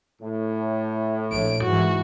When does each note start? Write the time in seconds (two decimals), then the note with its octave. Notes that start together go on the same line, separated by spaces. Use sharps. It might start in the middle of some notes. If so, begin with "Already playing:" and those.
0.22 A2
1.32 A#1 D7
1.64 G#2 E3 F#4